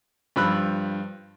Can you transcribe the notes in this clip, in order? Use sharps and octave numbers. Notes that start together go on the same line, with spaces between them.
G2 F3 B5 E6 F#6